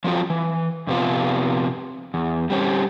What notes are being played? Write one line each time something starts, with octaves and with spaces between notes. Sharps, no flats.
F3 F#3 C4 D#4 F4
E3
F2 C3 B3 F4
E2
G3 C4 C#4